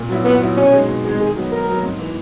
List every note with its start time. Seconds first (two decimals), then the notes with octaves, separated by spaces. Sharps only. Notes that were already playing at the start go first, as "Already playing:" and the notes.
Already playing: A#2
0.09 F#3 B3 E4
0.25 A#2 B3
0.41 F#3 B3 E4
0.57 B2 C#4
0.73 G#3 D#4 G#4
0.89 B2
1.05 G#3 D#4 G#4
1.20 D#3 G#4
1.36 F#3 B3
1.51 D#3 A#4
1.67 F#3 B3
1.83 G#2
1.99 E3 A#3